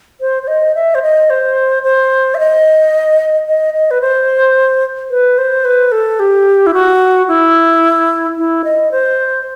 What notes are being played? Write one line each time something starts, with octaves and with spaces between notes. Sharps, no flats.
C5
C5
D#5
E5
C5
D#5
C5
C5
E5
D#5
D#5
D#5
B4
C5
B4
C5
B4
A4
G4
E4
F#4
E4
E4
D#5
C5